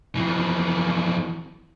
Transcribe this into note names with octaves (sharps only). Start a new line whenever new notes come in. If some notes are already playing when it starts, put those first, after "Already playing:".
F2 E3